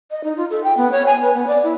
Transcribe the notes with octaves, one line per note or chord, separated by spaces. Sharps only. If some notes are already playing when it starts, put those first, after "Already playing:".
D#5
D#4
F4
A4
G5
B3
C#5
G#5
B4
B3
D5
E4